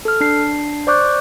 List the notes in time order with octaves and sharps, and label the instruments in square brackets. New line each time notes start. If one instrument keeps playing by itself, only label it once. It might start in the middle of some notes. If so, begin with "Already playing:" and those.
[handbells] A4 F6
D4 C7
C5 D5 C#6 D6 F#6 G6